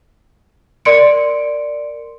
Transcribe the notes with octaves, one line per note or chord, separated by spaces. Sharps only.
A#4 D5 C6 C#7 D7